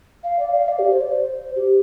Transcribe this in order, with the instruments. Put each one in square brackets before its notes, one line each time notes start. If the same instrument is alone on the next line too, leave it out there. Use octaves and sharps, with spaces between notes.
[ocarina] F5
D5
F5
D5
G4
C5
D5
C5
G4